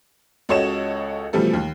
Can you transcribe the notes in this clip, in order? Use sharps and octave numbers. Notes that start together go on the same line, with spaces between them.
C#2 F#4 A4 C#5 D#5 E7
B2 E3 F3 G3 A3 A4
D#2